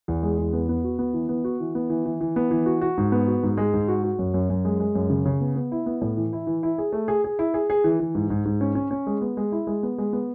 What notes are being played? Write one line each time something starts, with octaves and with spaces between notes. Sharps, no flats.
E2
G#3
E2
B3
B3
F#4
B3
E3
B3
F#4
E3
B3
E3
E3
E3
B3
E3
F#4
F#4
G#2
B3
F#4
G#2
G#3
G#2
F#4
F#4
F#2
F#2
F#2
G#3
G#3
F#2
C#3
C#3
B3
B3
E4
B3
A2
E3
E4
E3
E4
G#4
A3
G#4
G#4
E4
G#4
G#4
E3
E3
G#2
G#2
G#2
C#4
C#4
C#4
G#3
B3
G#3
E4
G#3
B3
G#3
B3